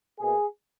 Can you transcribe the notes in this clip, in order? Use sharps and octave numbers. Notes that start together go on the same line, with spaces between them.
B2 A#3 G#4